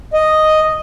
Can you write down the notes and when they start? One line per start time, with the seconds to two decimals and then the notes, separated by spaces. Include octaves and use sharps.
0.14 D#5